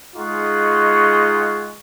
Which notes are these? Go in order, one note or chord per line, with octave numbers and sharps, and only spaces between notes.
G#3 D#4 F4 G#4 F#5 C#6